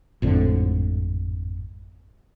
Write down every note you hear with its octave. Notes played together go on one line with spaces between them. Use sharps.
G#1 F2 A2 D3